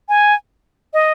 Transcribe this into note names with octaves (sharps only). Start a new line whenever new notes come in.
G#5
D#5